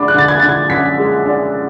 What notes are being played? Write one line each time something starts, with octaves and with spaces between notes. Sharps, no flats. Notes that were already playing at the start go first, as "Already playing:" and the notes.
Already playing: D3 G#3 D4 B5 D6
F#6
D3 A6
G#6
D3 A6
G#6
F#2 B6
G#3
D4